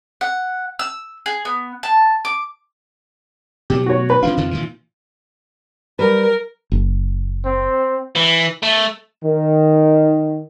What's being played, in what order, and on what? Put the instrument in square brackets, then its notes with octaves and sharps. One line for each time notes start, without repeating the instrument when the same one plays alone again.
[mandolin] F#5
E6
G#4
B3
A5
D6
[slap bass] B2 F#3 [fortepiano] G4
[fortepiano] F#4 C#5
B4
[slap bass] C3 F3 D4 [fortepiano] F4
[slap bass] F2 C3 D#3
A#2 D#3 E3
[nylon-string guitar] G3 B4 [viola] A#4
[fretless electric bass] F#1
[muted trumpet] C4
[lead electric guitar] E3
A3
[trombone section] D#3